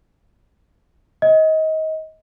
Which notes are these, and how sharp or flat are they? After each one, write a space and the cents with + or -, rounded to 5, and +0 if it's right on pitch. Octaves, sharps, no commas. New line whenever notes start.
D#5 +25